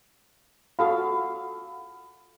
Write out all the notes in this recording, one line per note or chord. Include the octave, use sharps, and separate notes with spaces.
F4 F#4 A4 F5 F#5 D#6